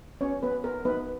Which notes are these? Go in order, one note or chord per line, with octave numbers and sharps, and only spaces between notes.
B3 C#4 C#5
B3 B4
B3 A#4
B3 D#4 B4